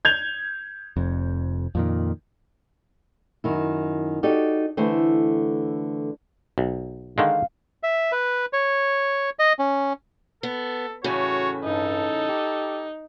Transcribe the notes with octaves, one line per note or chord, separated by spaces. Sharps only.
G6 G#6 F7
F1 F2
F2 A#2 D#3
F#2 D#3 E4
D#4 F#4 G4 A4 D5
D3 E3 A3 C5
B1
D3 D#3 G#3 F5
E5
B4
C#5
D#5
C#4
B3 A4
A2 C#3 E3 F#4 C#5
G2 D#4 A4
G4